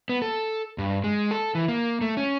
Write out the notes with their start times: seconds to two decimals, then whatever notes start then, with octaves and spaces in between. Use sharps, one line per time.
0.09 B3
0.22 A4
0.78 G2
1.04 G#3
1.31 A4
1.55 E3
1.68 A#3
2.01 A3
2.17 C#4